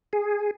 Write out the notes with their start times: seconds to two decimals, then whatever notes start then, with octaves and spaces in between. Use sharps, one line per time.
0.13 G#4